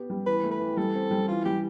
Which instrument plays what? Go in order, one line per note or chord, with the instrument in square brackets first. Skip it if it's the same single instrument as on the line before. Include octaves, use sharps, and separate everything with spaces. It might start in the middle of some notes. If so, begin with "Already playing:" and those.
Already playing: [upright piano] B3 G4
G3
[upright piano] E3 [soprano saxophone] B4
[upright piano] A3
[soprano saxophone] B4
[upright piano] E3
[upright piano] G3 [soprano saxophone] A4
[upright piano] C4
G3
[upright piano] E3 [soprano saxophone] F4
[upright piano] G3 [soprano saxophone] G4